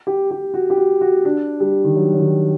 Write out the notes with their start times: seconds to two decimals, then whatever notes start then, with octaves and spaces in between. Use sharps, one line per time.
0.07 G4
0.31 G4
0.54 F#4
0.70 G4
0.77 F#4
1.01 F#4
1.25 D4
1.60 G3
1.84 D#3
1.96 F#3
2.13 F#3
2.19 D#3